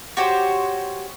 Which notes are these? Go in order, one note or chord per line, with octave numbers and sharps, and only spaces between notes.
F#4 G4 C5 C#5